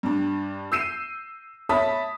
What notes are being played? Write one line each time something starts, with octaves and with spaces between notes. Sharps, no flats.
G2 D4
E6 G6 C7 D#7 E7
C#5 E5 A5 B5 D#6 B6